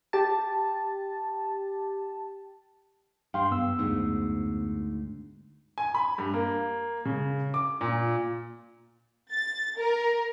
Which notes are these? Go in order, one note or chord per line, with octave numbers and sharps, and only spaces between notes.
G4 A5
G2 F5 G5 C6
F#2 B3 E6
D2 G#2
G#5
B5
G2
A#3
C#3
D6
A#2
A6
A#4